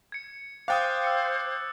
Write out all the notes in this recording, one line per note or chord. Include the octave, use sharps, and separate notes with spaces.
G#6 C#7
C5 F5 G5 D6 D#6 F#6 A6
E6 C#7